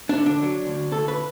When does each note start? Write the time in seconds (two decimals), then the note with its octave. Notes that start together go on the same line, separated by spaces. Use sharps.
0.09 D4
0.18 D3
0.26 D4
0.42 F#3
0.67 D2
0.92 D2 A4
1.08 B4